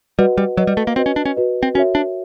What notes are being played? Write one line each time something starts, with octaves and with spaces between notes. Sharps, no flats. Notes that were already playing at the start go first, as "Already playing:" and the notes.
G3 F#4 B4 D#5 F#5
G3
F#3 F#4 B4 D#5 F#5
G3
A3
A#3
C4 F#4 B4 D#5
C#4
D4
C#4
F#4 B4 D#5
C4
C#4 F#4 A#4 C#5 E5
D4